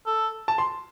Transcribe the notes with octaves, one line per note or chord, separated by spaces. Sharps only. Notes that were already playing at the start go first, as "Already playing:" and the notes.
A4
A5
C6